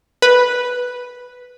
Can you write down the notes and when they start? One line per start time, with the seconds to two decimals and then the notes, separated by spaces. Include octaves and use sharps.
0.22 B4